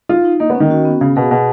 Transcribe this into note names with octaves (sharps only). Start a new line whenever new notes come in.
D#4 F4
D#4
A#3 D#4
B3
C#4
D#3
F#4
B3
C#3 F5
B2 G#4
B2 F#4